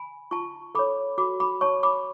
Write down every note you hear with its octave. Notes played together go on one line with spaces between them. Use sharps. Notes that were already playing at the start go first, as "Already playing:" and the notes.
Already playing: G#5 B5
F4 A5 C#6
A4 C#5 B5 D6
F#4 B5 D6
B5 D6
C#5 A5 C#6
B5 D6